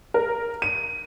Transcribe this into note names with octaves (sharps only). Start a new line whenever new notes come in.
A#4
D#7